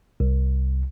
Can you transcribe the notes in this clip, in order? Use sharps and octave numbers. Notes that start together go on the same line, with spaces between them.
C2